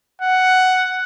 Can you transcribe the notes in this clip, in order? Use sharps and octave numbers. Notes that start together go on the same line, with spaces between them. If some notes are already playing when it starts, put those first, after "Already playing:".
F#5